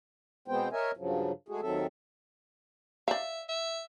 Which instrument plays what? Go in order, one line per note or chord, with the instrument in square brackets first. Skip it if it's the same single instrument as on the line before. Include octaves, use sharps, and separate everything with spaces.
[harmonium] B2 G#3 B3 C4 C5 G5
A#4 C#5 D#5 E5 G#5
G2 C#3 F3 F#3
G#3 A3 F#4 G#4
D#2 D#3 F#3 C4 A4 E5
[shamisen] D5 F5 [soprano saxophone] E5
[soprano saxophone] E5